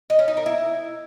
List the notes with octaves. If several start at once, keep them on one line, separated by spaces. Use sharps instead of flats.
D#5
C#4
D#4
A#4
E4